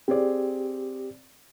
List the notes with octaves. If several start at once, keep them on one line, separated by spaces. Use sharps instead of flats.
C4 G4 G#4 D5